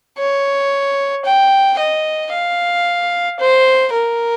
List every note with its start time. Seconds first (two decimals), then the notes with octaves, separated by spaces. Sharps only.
0.18 C#5
1.25 G5
1.79 D#5
2.32 F5
3.40 C5
3.93 A#4